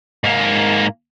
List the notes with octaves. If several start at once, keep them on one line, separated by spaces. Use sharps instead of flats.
G#2 A#3